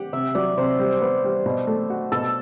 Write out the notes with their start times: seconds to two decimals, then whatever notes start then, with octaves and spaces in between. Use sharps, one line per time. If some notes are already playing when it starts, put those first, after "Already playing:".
Already playing: G4 F#5
0.13 C3 E5
0.35 F#3 D5
0.57 C3 C5
0.79 G3
1.01 B3
1.24 G3
1.46 B2
1.67 A3
1.90 F#4
2.12 B2 A4